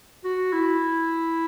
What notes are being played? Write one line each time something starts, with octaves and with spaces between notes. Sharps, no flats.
F#4
E4